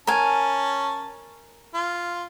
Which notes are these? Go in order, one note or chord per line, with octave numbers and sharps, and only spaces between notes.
C#4 A#4 G#5 A5
F4